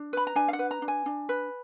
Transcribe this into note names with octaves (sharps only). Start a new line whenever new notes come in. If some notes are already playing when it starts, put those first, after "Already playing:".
Already playing: D4
B4 B5
A#5
D4 G#5
F5
F#5
B4
A#5
D4
G#5
D4
B4